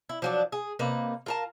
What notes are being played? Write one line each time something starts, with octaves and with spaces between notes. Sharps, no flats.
E4
F3 F#3 D4
G#4
C3 A#3 D#4 B4
F4 A#4 A5